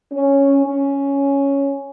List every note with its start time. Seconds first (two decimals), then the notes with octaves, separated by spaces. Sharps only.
0.12 C#4
0.66 C#4